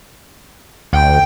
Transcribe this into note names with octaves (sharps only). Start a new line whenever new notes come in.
D2 G5